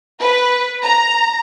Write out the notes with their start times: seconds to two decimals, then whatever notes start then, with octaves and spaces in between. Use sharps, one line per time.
0.20 B4
0.84 A#5